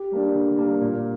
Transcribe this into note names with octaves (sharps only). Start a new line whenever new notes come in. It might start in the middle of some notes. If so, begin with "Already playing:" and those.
Already playing: G4
G3 A#3 D4
D3
G3 A#3 D4
A#2